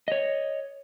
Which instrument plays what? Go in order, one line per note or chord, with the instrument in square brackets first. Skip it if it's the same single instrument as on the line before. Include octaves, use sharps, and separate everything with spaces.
[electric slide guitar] C#5 D#5